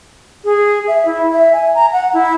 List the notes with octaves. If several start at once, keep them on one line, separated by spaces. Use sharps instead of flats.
G#4
E5
E4
E5
G#5
A#5
F#5
E4